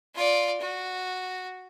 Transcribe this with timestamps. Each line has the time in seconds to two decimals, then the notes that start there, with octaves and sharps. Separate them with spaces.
0.15 F4 D5
0.61 F#4